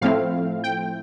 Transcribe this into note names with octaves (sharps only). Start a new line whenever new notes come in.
A2 F3 A3 C4 E4 F5
G5